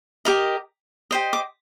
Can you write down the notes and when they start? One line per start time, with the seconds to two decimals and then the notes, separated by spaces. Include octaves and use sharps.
0.25 G4 A#4 D#5
1.11 G4 C5 D#5
1.33 D6